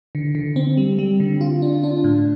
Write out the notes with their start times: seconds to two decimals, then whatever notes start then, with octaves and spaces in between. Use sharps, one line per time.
0.15 D3
0.35 D3
0.56 C4
0.77 G3
0.99 G3
1.20 D3
1.41 F4
1.62 D4
1.84 D4
2.04 A2